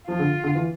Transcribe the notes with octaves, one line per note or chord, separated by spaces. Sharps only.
F3 F4
D3
D3
E3